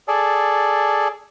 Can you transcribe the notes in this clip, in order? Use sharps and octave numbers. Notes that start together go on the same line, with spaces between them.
G#4 A4 D5